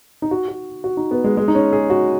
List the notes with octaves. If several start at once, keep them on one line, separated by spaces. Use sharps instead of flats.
D#4
F#4
F#4
F#4
D#4
B3
G#3
G#3
D#4
C#4
G#4
F#4